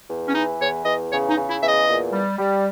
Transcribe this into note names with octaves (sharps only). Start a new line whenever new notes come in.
E2
C#4
E3 D#4
E2 C#5
E2 D#5
C#3 C#5
D#4
C#3
E4
E2 E5
D#5
A#2
G3
G3